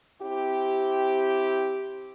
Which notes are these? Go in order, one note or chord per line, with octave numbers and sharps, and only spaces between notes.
C4 E4 G4